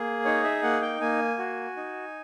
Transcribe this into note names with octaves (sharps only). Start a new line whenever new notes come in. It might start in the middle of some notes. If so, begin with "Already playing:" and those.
Already playing: A#3 G#4
D#4 C#5
E5
A#3 F#5
G5
A#3 G#5
F#4
D#4